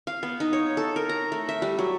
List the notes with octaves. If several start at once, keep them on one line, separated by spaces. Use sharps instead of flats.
F5
B3
D#4
C#5
A4
A#4
A#5
A3
E5
G3
F#3